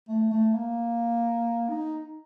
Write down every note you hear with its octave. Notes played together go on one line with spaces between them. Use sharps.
A3
A3
A#3
D#4